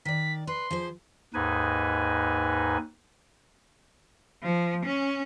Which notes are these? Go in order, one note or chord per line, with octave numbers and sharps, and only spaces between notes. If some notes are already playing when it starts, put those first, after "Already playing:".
D#3 D5 B6
B4 C6
F3 G#4 C5
D#2 G#2 D#4 B4 G#5
F3
C#4